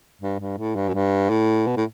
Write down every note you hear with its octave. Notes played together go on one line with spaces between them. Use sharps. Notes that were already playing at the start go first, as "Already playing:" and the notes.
G2
G2
A2
G2
F#2
G2
A2
B2
A2